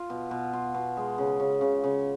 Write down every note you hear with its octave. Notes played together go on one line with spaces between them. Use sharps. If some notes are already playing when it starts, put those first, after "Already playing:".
Already playing: F4
B2
B2
F4
B2
G#3
C#3
C#3
C#3
C#3